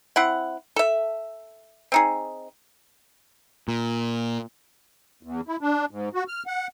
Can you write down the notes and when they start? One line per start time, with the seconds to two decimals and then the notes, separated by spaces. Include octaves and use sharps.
0.16 C4 E4 F#5
0.76 A4 E5
1.92 C4 D#4 G#4
3.68 A#2
5.23 E2
5.48 E4
5.61 D4
5.91 G#2
6.14 F#4
6.28 F6
6.47 F#5